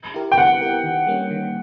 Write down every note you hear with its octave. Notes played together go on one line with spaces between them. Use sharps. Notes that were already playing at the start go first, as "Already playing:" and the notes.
E4 G4 A#4
G5
B3 F#5
E4 G4 A#4
D#3
G3 A#3 C#4
D#3